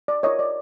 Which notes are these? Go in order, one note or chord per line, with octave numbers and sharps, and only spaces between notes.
D5
F4 A#4 C#5 D#5
D5